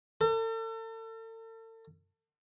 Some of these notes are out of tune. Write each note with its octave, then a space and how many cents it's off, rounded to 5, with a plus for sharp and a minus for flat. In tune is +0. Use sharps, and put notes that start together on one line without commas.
A4 +40